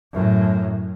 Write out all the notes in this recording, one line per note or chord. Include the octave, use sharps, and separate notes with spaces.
F#2 A2